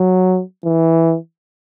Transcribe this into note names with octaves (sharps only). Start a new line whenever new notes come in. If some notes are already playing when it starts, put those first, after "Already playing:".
Already playing: F#3
E3